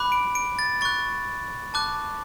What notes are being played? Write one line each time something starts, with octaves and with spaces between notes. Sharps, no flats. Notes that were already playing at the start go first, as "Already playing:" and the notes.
Already playing: B5 D6 F#6
D7
D7
A6
C#6 F#6 A6
A5 D6 F#6